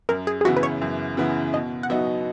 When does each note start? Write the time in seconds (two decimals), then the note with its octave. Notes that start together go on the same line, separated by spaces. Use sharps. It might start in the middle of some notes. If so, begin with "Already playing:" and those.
0.09 F#2 A#4
0.27 G#4
0.41 G#4
0.45 C#3 E3 B3 E4 F#4
0.57 B4
0.63 C#5
0.82 F#2
1.17 C#3 E3 B3 E4
1.53 B2 D#5
1.83 F#5
1.90 F#3 B3 D#4 F#4 E5